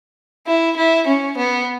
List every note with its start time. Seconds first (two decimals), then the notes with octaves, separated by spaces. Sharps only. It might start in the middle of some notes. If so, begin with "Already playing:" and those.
0.47 E4
0.77 E4
1.07 C#4
1.37 B3